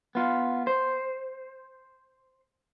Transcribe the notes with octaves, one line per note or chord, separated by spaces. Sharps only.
B3 F4
C5